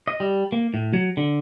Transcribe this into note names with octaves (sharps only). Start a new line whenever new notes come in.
D#5
G3
A#3
A2
F#3
D3